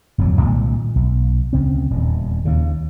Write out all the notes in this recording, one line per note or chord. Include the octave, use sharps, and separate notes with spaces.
D1 F2 G#2 F#3
C2 A#2 D#3 G#3
B1
D2 C#3 C4
D#1 E2
D#2 C#3